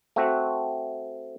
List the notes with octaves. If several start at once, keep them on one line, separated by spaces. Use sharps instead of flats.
A3 C4 F#4